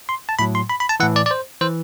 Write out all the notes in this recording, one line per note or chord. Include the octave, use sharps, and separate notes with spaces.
C6
A5
A2 F#3 B5
C6
B5
B5
A5
A2 E3 F#5
D5
D5
C5
E3 C5